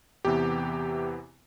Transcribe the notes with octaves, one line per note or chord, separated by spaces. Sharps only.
E2 C3 E3 B3 G4